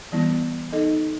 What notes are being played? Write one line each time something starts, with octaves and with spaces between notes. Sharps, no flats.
E3 G3 B3 E4
D#4 A4 D#5